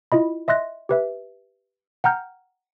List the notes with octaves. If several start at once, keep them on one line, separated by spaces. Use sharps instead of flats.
E4 F4 D#5 B5
D#5 E5 C6 F#6 A#6
G4 B4 E5
F#5 G5 A#5 F6 G6